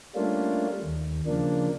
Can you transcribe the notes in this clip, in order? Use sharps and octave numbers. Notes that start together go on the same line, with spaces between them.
G3 A3 A#3 C#4 D4 F4
D#2
C#3 F3 A#3 D4